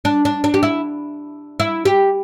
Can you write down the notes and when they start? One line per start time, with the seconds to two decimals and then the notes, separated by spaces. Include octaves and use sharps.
0.05 D4
0.25 D4
0.44 D4
0.54 G4
0.63 E4
1.60 E4
1.85 G4